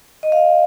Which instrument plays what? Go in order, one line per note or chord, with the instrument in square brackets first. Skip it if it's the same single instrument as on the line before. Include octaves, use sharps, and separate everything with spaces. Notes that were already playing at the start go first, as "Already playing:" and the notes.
[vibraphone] D#5
F5